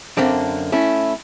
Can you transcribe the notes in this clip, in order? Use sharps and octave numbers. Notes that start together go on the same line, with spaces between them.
F#2 D3 A#3 C4 D4
A3 C#4 E4